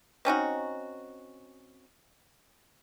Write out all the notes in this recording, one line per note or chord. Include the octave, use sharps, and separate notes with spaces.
C4 C#4 D#4 F#4